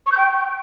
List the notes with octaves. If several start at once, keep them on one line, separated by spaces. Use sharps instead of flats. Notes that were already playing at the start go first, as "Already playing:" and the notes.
C#6
G6
G5